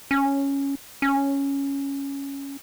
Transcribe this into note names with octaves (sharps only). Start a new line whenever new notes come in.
C#4
C#4